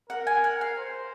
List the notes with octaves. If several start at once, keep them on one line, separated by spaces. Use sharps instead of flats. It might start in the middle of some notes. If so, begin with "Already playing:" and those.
A#4 F#5
G#5
F#5
F5
C5